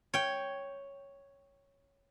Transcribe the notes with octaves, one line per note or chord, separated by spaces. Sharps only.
C#5 G5